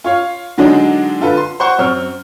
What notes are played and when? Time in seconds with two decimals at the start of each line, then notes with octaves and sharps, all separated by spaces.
0.04 F4 C#5 F5
0.58 D3 F#3 G#3 D4 D#4
1.21 D3 F4 A4 B4
1.37 C6
1.60 C5 F#5 C6 C#6
1.79 F#2 C4 C#6 F6